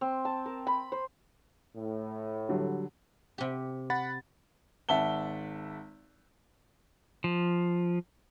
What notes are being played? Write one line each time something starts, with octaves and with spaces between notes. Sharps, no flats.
C4
A5
A#4
B5
C5
A2
D3 F#3 G3
C3 G4
F#5 B5 A6
G#1 E5 F#5 A5 G7
F3